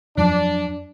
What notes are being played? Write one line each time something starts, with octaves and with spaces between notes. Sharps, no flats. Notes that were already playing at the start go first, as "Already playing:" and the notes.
F2 F3 F#3 D4